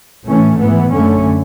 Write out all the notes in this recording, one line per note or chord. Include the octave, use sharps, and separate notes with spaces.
A2 E3 A3 C#4
G#2 E3 B3
F#2 D3 A3 C#4